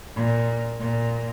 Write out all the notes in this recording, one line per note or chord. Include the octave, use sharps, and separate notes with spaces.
A#2
A#2